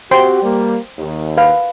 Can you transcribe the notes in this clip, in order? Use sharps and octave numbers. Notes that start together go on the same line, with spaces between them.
C4 F#4 G4 C5 G5 C6
G3 A#3
D#2
B4 F5